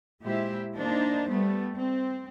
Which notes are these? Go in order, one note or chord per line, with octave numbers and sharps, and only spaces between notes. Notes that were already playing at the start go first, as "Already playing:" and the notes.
A#2 G#3 E4 G4 C5 E5
A#3 D4 D#4 C5
G3 A3 B3
C4